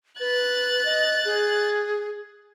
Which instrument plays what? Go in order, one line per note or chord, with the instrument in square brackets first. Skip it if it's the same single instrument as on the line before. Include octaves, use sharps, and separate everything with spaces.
[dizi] B4 [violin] F#6 A6
[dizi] D#5
G#4